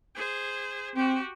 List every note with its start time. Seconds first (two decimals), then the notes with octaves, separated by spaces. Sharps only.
0.15 G#4 C5
0.96 C4 F#4 G4